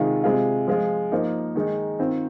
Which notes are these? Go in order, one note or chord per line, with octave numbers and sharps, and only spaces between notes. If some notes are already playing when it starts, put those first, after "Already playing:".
Already playing: C3 D#3 G#3 F4
C3 G#3 F4
F3 G#3 F4
F3 A#3 D#4
D#3 G#3 D#4
D#3 C4 F4